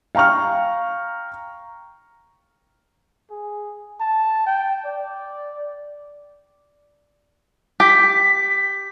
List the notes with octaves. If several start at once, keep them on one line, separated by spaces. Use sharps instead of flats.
F5 G5 A#5 C#6 F6
G#4
A5
G5
D5
G4 B6